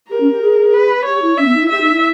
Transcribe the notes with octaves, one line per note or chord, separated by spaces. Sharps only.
G4 A#4
C#4
G4
G#4
B4
G4 C#5
E4
C#4 E5
B3
D#4
E4
G4 E5
D#4
E4